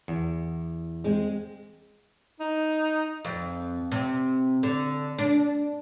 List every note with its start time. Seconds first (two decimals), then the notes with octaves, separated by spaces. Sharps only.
0.08 E2
1.04 G#3 C4 G#4
2.40 D#4
3.25 F2
3.92 C3
4.63 D3
5.19 D4